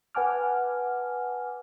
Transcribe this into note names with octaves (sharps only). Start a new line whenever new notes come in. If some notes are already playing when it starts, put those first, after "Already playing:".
B4 F#5 G#5 A5 D6 F6